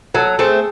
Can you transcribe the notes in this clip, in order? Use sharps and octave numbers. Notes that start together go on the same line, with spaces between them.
F#3 A4
A3 C4 G#4